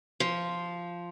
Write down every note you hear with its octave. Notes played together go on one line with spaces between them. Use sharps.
F3